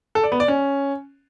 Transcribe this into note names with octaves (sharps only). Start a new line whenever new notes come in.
A4
D5
B3
D5
C#4